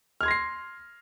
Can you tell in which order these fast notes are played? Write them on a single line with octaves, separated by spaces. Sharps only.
F6 G#6 C6 A#6 C7